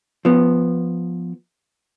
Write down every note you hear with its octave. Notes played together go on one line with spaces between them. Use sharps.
F3 B3